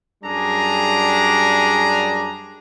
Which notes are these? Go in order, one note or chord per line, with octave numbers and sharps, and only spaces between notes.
F#2 G3 D4 G#4 A#5